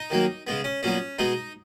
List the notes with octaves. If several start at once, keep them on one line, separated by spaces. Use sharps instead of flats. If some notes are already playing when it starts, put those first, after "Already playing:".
Already playing: D#4
D#3 F#3 A#3
C#3 G#3 B3
C#4
A#2 F#3 B3 C#4
B2 G#3 B3 D#4